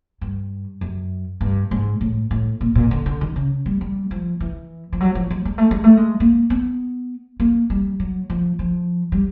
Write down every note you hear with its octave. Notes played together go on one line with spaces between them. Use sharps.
G2
F#2
G2
G#2
A2
A2
A#2
A#2
D3
D3
D#3
C#3
G3
G3
F3
E3
F3
F#3
F3
F#3
G#3
A3
G#3
A3
G#3
A#3
B3
A#3
G3
F#3
F3
F3
G3